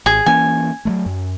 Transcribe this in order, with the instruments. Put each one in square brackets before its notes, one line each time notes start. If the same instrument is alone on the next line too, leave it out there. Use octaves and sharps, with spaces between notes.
[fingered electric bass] G#1 [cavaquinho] G#4
[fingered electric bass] E3 A#3 C#4 [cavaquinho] G#5
[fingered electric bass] F#3 G3 A3
F#2